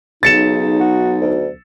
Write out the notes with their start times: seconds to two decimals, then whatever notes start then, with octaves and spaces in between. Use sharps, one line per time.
0.23 B1 C#3 D#4 A6 C#7 E7
0.80 F#4
1.21 D2